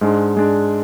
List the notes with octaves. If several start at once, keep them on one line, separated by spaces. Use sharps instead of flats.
G#2 G#3 D4
G#2 G#3 D4